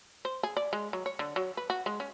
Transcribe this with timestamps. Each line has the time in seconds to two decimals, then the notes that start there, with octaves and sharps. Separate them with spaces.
0.25 C5
0.43 G#4
0.57 D5
0.73 G#3
0.93 F#3
1.06 C#5
1.19 D3
1.36 F#3
1.57 B4
1.70 F#4
1.86 G#3
2.00 C#4